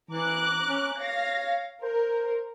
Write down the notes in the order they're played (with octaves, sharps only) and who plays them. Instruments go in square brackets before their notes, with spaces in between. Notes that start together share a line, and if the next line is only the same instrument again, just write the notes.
[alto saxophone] E3 [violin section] A#5 D6 F#6
[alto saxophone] C#4
[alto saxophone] C#5 [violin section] F5 A#6
[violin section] A#4 [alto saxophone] C5